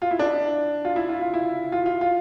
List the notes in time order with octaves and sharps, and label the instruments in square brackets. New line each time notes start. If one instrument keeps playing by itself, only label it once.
[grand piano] F4
E4
D4
F4
E4
F4
F4
E4
F4
F4
F4